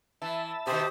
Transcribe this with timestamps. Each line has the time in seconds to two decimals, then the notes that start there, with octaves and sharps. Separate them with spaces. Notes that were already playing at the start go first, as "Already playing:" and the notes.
0.22 E3 E5 A5
0.67 B2 D#3 G4 C5 D#6